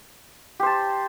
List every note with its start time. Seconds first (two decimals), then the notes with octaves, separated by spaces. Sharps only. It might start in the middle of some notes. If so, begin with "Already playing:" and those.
0.60 G4
0.63 C5
0.66 A5